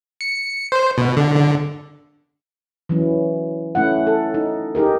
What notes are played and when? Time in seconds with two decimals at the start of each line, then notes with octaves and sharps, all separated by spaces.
0.21 C#7
0.72 C5
0.98 B2
1.17 D3
1.36 D3
2.89 E3 F#3 C#4
3.75 A3 C#4 E4 F#5
4.07 A4
4.34 D#4
4.75 D#4 G4 G#4 A#4